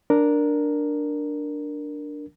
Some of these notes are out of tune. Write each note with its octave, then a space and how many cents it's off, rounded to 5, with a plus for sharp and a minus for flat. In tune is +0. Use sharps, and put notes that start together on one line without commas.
D4 +0 A#4 +0